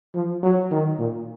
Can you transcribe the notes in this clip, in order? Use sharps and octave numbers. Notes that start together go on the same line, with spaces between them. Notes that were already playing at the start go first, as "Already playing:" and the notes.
F3
F#3
D#3
A#2